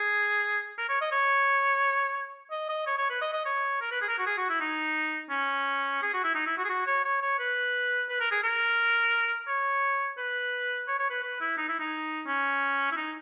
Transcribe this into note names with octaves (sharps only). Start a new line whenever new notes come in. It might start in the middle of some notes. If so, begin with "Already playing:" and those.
Already playing: G#4
A#4
C#5
D#5
C#5
D#5
D#5
C#5
C#5
B4
D#5
D#5
C#5
A#4
B4
G#4
A#4
F#4
G#4
F#4
E4
D#4
C#4
G#4
F#4
E4
D#4
E4
F#4
G#4
F#4
C#5
C#5
C#5
B4
B4
A#4
G#4
A#4
C#5
B4
C#5
C#5
B4
B4
E4
D#4
E4
D#4
C#4
E4
D#4